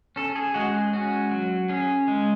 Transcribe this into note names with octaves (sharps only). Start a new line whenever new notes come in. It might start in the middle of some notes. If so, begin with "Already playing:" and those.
C#4 A4
G#4
G#3 F#4
G#4
C#4 F#4
F#3
C#4 G#4
G#3